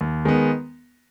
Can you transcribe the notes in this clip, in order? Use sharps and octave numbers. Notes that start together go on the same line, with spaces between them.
D#2
D#3 G#3 B3